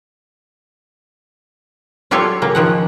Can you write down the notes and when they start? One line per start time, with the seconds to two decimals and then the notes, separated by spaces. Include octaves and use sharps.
2.11 F#3 F4 G4 A4 C#5 D5
2.42 C#3 A#3
2.55 D#3 F3 F#5